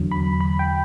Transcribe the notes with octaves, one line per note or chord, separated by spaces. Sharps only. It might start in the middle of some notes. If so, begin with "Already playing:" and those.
Already playing: E2 D3 F#3
B5
B5
G5